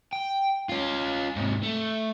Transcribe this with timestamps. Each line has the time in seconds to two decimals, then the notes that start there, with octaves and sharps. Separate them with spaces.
0.13 G5
0.69 C#4 F4
1.36 G#2 C3
1.63 A3